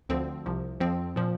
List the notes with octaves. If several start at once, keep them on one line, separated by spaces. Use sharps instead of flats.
D2 D3 F3 C4
C2 C3 F3
F2 F3 C4
A#2 F3